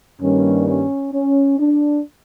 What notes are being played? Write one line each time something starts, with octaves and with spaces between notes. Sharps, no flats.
G2 D#3 G3 A#3 C#4
C#4
C#4
D4